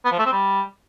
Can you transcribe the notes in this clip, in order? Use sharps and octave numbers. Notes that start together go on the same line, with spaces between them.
B3
F3
A3
C4
G3